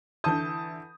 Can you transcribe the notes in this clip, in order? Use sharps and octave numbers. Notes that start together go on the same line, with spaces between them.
D3 E3 A5 D#6 G6